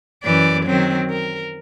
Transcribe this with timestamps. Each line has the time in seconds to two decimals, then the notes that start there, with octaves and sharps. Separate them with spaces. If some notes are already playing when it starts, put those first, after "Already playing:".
0.24 F#2 E3 D5
0.66 D#3 F#3 C4
1.10 A#4